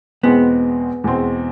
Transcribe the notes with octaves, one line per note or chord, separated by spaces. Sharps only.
E2 B2 G#3 B3 C4
E2 B2 G#3 C4